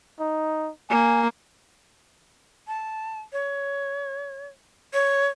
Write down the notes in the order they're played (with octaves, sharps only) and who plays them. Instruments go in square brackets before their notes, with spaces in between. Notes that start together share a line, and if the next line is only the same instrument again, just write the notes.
[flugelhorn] D#4
[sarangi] A#3 [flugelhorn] G#5
[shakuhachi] A5
C#5
C#5